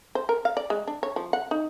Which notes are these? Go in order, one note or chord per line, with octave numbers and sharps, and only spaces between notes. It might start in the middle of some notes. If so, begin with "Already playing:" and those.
C5
A#4
F5
D5
G#3
D4
C#5
F3
F#5
D#4